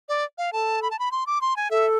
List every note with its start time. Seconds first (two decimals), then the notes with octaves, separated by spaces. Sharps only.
0.09 D5
0.38 F5
0.53 A4 A5
0.82 B5
0.91 A5
0.99 B5
1.12 C6
1.27 D6
1.41 C6
1.56 G#5
1.70 A4 E5